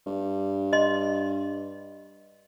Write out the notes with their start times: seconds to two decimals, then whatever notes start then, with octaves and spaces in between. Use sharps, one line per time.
0.06 G2
0.73 D#5 C6